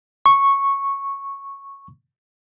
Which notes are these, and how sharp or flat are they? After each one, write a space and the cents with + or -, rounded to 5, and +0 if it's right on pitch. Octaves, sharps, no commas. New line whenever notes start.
C#6 -10